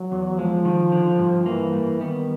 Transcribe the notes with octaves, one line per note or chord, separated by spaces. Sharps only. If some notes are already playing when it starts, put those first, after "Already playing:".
Already playing: F#3
E2
F3 G#3
D#3
D3
G2
E3 A#3
G3
D#3 B3